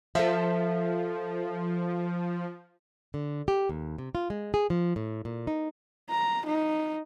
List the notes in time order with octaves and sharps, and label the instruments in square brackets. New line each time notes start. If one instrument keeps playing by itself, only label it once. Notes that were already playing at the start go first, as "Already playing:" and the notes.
[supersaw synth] F3 [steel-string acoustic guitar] A4 E5
[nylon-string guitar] D3
G4
D#2
C3
F4
G#3
G#4
F3
A2
A#2
D#4
[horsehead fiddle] A#5
D#4